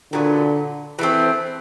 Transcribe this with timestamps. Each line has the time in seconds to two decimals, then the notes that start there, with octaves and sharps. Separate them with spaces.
0.13 A#2 D3 F#3 B3
0.99 E3 A3 C4